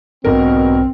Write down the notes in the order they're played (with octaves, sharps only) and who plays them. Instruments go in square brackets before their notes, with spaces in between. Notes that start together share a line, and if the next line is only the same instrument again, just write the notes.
[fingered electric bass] B1 G#2 D4 [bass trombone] B2 [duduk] C4 [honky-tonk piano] A#4